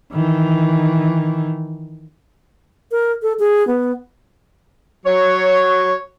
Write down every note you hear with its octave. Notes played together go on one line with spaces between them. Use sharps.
D#3 E3
A#4
A4
G#4
B3
F#3 C#5